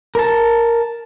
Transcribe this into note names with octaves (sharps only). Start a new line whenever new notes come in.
A#4 A5